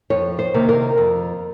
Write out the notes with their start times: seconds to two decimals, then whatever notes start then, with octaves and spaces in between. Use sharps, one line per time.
0.10 F2 C#5
0.39 C5
0.54 C3 D#3 A#3
0.69 A#4
0.98 F2